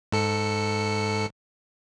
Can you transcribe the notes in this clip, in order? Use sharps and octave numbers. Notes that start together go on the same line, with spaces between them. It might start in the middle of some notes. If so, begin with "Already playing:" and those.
G#2 A4 C#7